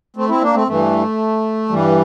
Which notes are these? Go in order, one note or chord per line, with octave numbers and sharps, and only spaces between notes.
A3 C4
C4 E4
A#3 D4
A3 C4
G2 E3 A3
G2 E3 G3